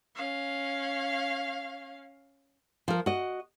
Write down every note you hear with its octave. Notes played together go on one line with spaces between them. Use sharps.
C#4 F5
F3 A#4
F#4 D#5